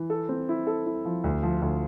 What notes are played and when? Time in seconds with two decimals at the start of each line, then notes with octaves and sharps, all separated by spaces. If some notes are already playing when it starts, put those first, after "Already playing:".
Already playing: E3
0.10 A4
0.29 C4
0.49 E4
0.67 A4
0.86 E4
1.05 F3
1.24 D2
1.43 F3
1.62 D2